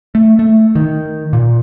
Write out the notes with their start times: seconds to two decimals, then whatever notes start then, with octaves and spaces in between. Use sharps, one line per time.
0.15 A3
0.39 A3
0.75 D#3
1.33 A#2